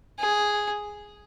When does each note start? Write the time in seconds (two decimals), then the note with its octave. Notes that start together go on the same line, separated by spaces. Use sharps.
0.19 G#4